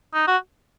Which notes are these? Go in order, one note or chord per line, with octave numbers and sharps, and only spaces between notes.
D#4
F#4